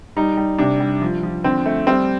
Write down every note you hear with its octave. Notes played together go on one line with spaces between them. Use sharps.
G3 D#4
G3
C3 D4
G3
F3
F3
D3 C4
A3
G3 C4